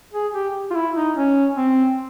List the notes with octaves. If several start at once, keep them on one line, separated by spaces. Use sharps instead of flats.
G#4
G4
F4
E4
D#4
C#4
C4